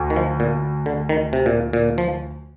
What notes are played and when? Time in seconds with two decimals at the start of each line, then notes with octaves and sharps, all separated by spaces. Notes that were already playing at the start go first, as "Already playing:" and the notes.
Already playing: D2
0.10 D#3
0.16 F3
0.40 A#2
0.86 D3
1.09 D#3
1.33 C3
1.46 A#2
1.73 A#2
1.98 F3